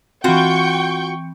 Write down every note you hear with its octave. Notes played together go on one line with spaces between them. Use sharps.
E3 C4 F4 F#4 G5 C#6 G6